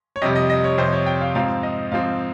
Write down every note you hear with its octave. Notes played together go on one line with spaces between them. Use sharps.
C#5
F2 C3 G3 D#5
D#5
D#5
C#5
F2 C3 G3 C5
C#5
G5
F5
G#2 F3 C4 F5
D#5
G#2 F3 C4 F5